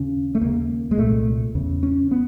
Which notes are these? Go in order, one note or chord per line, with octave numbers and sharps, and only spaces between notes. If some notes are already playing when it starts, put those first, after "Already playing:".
Already playing: D#2 C#3 C#4
A3
D#2 C#3 A#3
G#3
C2 A#2 A3
E2 C#3
C#4
B3